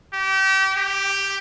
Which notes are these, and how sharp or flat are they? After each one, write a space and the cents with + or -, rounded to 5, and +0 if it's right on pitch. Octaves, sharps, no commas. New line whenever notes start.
G4 -30
G4 +5